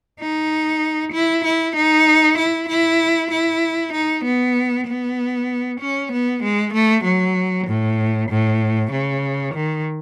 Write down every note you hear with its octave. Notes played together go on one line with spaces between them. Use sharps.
D#4
E4
E4
D#4
E4
E4
E4
D#4
B3
B3
C#4
B3
G#3
A3
F#3
A2
A2
C#3
D#3